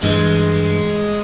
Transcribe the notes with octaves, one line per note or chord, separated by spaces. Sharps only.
G2 E3 G#3